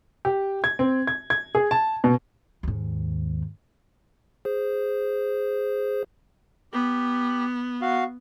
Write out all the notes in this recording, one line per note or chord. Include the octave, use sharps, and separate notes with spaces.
G4
G#6
C4
G#6
G#6
G#4
A5
B2
D#2 G#2
G#4 C5
B3 G4
F#4 F5